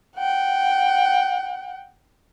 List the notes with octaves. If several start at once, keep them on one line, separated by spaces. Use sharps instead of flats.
F#5 G5